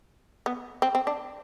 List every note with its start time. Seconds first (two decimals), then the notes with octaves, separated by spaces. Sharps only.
0.46 B3
0.82 C4
0.95 C4
1.07 D4